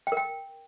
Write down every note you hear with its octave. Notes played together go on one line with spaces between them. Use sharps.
G5
A#4
G5